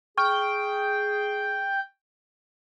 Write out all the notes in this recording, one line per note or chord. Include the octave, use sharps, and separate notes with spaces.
G#4 G5 C#6 F6